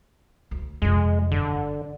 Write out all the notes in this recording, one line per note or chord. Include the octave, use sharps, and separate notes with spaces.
D2
F2 C3 G#3
G1 D3